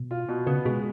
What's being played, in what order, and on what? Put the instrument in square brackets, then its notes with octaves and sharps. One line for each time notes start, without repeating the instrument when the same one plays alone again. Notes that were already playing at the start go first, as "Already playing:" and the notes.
Already playing: [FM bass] B2
[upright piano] F4
B2
[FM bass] C#3 [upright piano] B3
[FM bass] B2 [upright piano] G#3